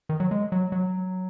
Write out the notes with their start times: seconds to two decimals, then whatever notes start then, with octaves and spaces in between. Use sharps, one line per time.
0.09 D#3
0.20 F#3
0.31 G#3
0.52 F#3
0.72 F#3